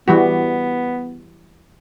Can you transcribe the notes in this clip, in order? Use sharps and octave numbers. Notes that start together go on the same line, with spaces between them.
E3 G3 B3 F#4